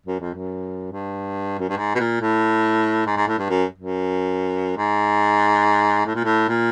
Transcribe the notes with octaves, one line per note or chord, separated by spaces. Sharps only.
F#2
F2
F#2
G2
F#2
G2
G#2
B2
A#2
A2
G#2
G#2
A2
G2
F#2
F#2
G#2
A2
A#2
A2
A#2